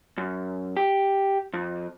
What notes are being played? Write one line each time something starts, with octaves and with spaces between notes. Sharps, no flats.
F#2
G4
F2